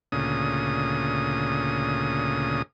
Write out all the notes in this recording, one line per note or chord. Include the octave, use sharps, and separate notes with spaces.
D2 A#2 C#3 D#6